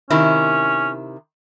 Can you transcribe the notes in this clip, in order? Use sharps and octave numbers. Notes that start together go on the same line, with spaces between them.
C3 D#3 C#4 E4